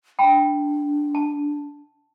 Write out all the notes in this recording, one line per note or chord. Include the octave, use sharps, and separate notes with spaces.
D4 G5 A5 B5
A5